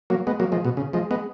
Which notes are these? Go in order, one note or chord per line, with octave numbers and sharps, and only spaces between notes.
F#3 A#3
G#3 B3
F#3 A#3
F3 G#3
B2
C#3
F3 G#3
G#3 B3